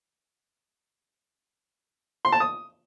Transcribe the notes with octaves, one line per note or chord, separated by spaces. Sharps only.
C6
A5
D#6